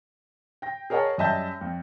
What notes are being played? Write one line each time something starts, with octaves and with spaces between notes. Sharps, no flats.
G5 A#6
G#4 A#4 C#5 D#5 F#5 A5
F#2 G3 D#5 E5 A5 G6
F2